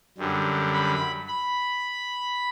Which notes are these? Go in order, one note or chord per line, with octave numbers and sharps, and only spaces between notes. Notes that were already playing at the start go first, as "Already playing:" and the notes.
F#2 D3 G3
B5
B5